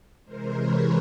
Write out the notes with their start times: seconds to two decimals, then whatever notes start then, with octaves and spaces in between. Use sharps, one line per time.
0.25 C3 E3 G#3 A#4 C5
0.56 B4 C#5